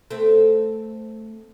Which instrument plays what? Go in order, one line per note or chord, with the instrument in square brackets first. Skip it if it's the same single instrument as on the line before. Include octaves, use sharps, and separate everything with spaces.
[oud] A3 C4